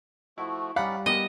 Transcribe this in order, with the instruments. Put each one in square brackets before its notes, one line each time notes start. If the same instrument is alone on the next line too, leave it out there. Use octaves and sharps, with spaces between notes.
[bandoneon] F3 A3 F#4 [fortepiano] E4
[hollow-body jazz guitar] G3 F5 [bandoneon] C#4 D#4 D5 [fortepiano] F#5 B5 D6
[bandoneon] G#3 [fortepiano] B3 G4 A#4 [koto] D#5